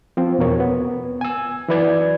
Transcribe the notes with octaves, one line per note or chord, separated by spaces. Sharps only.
F3 C4
E2 B2 A#4 C#5
B3
G#5 E6
E3 F#3 B4 D5 G#6